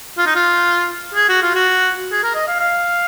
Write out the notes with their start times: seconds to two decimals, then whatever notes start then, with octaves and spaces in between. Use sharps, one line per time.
0.18 F4
0.26 D#4
0.35 F4
1.14 G#4
1.29 F#4
1.42 F4
1.55 F#4
2.12 G#4
2.23 A#4
2.35 D#5
2.47 F5
2.59 F5